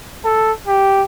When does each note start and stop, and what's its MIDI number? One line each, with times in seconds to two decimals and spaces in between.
0.25 0.52 69
0.68 1.04 67